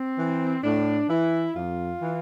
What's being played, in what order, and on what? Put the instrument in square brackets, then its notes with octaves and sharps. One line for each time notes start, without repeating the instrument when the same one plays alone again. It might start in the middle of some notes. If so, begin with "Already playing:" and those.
Already playing: [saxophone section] C4
E3
A2 D4
E3 E4
F2 F4
E3